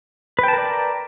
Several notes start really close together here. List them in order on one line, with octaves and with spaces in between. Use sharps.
B4 G5 A5 A#4 D5